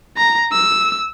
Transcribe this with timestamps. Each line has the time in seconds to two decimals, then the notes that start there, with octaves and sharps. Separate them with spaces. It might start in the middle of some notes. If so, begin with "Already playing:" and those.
0.17 A#5
0.52 E6